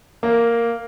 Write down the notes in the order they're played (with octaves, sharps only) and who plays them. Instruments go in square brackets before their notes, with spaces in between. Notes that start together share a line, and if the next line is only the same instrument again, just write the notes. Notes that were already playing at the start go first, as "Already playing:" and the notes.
[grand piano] A#3